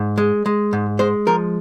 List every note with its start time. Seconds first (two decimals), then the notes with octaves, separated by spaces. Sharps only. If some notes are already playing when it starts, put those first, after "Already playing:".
Already playing: G#2
0.18 G#3
0.46 G#3
0.73 G#2
0.99 G#3 C5
1.27 F3 A#4